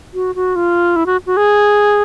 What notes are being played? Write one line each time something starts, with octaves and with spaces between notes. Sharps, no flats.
F#4
F#4
F4
E4
F#4
F#4
G#4